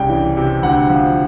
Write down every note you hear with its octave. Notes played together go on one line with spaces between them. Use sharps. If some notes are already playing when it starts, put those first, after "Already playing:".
Already playing: C2 C#3 G5
E3
C3
D2 F#5
F3